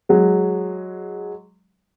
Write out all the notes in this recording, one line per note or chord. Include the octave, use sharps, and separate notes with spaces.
F#3 G#3